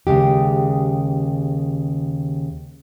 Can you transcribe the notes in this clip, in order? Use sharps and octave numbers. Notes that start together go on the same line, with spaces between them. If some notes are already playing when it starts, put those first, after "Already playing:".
D#2 C#3 G#3 G4